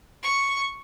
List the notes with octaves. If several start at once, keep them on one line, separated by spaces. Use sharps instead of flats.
C#6